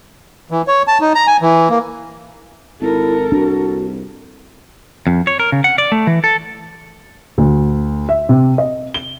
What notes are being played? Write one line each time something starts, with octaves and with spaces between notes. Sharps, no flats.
E3
C#5
A5
D#4
A#5
G#5
E3
A#3
G#1 E4 A4 A#4
C2 D4 F#4
F2
C#5
A#4
C#3
F#5
D5
A3
E3
A4
D2
E5
C3
D#5
G7